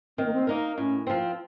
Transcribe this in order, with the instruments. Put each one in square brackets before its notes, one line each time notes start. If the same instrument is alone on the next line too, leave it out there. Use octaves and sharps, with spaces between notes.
[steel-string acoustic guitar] D#3 [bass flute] C4
[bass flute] A#3
C4
[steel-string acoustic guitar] A#3 D#4 A#4
[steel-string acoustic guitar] A2 [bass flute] C#4
[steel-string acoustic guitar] F3 C4